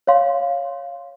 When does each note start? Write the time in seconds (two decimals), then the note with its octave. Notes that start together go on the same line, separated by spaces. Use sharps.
0.07 C#5 F5 C6